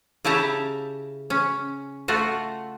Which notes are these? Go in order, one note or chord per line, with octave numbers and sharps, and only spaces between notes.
C#3 E4 G4 A5 A#5
C#4
A3 F4 F#4